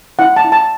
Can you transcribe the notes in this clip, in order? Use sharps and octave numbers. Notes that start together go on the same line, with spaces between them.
E4 F#5
A5
E4
A5